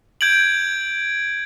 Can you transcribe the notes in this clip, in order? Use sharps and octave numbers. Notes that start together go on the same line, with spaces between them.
G6 G#6 D7 F#7